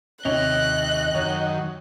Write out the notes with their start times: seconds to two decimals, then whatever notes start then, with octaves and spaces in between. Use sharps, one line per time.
0.25 D#2 C3 C#5 D#5 F#6 F7
1.14 F#2 D#3 C#5